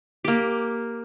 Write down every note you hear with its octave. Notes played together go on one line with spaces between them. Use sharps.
A#3 G4